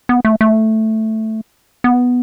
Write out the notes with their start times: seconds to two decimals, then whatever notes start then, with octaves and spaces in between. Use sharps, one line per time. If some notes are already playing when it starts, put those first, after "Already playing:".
0.09 B3
0.25 A3
0.41 A3
1.84 B3